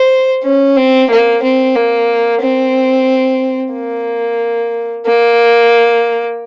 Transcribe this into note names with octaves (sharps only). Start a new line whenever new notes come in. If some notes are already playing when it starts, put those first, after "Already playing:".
Already playing: C5
C#4
C4
A#3
C4
A#3
C4
A#3
A#3